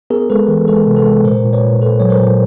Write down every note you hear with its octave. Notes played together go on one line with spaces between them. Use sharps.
B3 G#4 A#4
G#3 A4 B4
E3
G#3 A4 B4
C3
A4 B4
G#3
A#2 A#4 C5
A#2
B4 C#5
A#2
A#2 A4 B4
F#3 C#5
A#4 C5
A#2